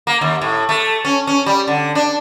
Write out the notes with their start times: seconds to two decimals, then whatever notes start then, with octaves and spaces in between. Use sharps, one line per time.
0.07 A#3
0.21 D#2
0.42 A2
0.69 A3
1.05 C#4
1.27 C#4
1.46 G3
1.68 D3
1.95 D4